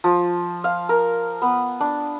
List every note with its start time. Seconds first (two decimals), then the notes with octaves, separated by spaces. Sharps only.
0.04 F3
0.64 F5
0.89 A#4
1.42 B3
1.80 D4